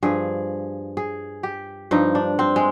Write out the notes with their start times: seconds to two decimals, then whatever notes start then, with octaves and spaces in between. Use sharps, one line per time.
0.03 G2 F3 G#4
0.97 G#4
1.43 G4
1.91 G2 F3 D#4
2.15 D4
2.39 C4
2.56 G#3